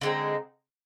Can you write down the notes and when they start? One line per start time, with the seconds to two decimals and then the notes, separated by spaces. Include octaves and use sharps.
0.01 D3 G#3 C4 D#4